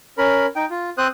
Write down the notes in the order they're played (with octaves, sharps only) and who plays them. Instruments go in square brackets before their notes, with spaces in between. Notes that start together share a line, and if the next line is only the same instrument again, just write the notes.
[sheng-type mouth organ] C#4 A#4 B5
D#4 G5
F4
C4 C5 D#6 F#6